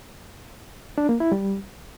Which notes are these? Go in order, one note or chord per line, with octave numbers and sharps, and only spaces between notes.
D4
A#3
E4
G3